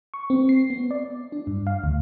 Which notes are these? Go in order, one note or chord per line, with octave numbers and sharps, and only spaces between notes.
C#6
C4
C7
B3
D5
D4
G2
F5
D2